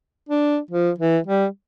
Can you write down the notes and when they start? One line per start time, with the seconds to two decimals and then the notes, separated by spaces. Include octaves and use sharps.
0.29 D4
0.71 F3
0.98 E3
1.27 G3